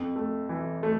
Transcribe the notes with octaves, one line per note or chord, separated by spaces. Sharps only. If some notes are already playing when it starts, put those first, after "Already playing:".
Already playing: F2
A3
E3
A3